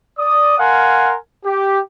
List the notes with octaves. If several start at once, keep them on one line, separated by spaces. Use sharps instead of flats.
D5 D#6
A#4 F5 F#5 G#5 C6
G4